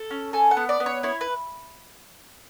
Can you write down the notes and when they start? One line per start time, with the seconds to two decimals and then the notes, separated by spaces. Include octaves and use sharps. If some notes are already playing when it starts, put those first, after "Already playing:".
Already playing: A4
0.11 C#4
0.33 A4 G#5
0.51 F#5
0.57 B3
0.69 D5
0.80 B3
0.86 C#5
1.03 E4 C#5
1.21 B4